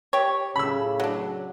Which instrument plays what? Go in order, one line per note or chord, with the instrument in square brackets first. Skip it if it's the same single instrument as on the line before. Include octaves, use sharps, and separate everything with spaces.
[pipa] G4 C#5
[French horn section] A2 C#3 [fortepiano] B5 E6
[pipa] F#3 D4